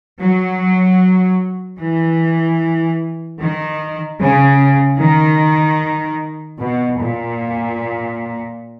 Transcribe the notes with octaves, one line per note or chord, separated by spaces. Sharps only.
F#3
E3
D#3
C#3
D#3
B2
A#2